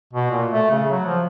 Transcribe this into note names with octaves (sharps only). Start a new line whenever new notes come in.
B2
A#2
A3
C#3
F#3
F3